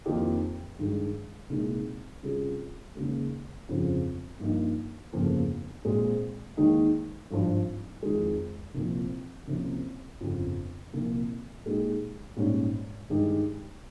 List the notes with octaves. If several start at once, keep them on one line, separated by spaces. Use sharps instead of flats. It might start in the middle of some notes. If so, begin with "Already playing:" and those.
F2 D#3 A#3 D#4 G4
G2 D#3 G#3
C2 A#2 G#3 D#4
C3 G3 C#4 F4 G#4
D#2 C#3 G#3
G1 F2 C#3 F3 C4
G2 F3 A#3 D#4
G1 F2 C#3 F3 A#3
A#1 A#2 G#3 C4
D#2 D#3 G#3 D#4
G#1 G2 F3
F2 D#3 G#3
C2 A#2 F3 C4
C2 C3 F3 A#3 C#4
G1 F2 C#3
C2 A#2 F3 A#3
A#2 G#3 D#4 G4
A#1 G#2 G3 C#4
G2 D#3 G#3 D#4 G4